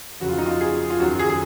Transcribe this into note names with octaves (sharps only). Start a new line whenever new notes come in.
F2 C#3 F#3 F#4
F4
D#4
F4
G#4
F4
F#2 D#3 F#3 F#4
G#4
G#4